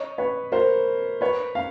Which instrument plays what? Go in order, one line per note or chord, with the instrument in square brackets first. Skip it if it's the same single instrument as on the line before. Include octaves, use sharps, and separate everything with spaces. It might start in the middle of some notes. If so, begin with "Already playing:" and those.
Already playing: [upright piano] C#5 D#5
B4 C#5
A#4 C5
B4 C#5
F5